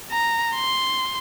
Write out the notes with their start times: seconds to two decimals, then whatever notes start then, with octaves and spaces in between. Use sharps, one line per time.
0.12 A#5
0.56 C6